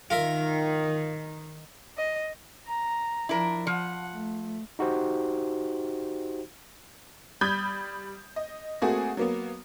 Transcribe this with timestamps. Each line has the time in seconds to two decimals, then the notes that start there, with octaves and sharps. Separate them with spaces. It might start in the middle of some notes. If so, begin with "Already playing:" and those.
0.10 D#3 F4 A#4 E5
1.99 D#5
2.66 A#5
3.29 F3 D4 E4 A#4
3.67 F3 F#5
4.13 A3
4.79 D#4 F#4 G4 C5
7.41 G3 B5 D#6 G6 G#6
8.36 D#5
8.82 A3 A#3 C4 F#4 G#4
9.17 F#3 A#3 B3